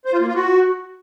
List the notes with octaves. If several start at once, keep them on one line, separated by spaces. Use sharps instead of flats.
C5
F4
A#3
F4
F#4